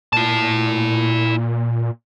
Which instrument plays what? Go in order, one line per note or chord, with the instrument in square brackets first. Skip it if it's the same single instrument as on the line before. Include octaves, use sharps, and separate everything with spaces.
[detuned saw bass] A#2 [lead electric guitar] E4 A5